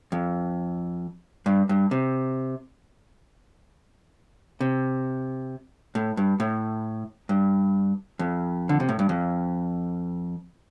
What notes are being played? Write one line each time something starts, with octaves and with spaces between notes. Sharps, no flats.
F2
G2
G2
C3
C3
A2
G2
A2
G2
F2
D3
C3
A2
G2
F2